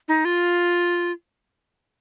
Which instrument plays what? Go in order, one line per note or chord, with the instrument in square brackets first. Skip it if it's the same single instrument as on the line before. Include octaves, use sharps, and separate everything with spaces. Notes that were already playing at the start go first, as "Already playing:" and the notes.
[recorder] D#4
F4